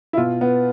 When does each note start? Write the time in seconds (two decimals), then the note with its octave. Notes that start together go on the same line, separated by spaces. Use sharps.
0.13 E4
0.17 B2 F4
0.41 B3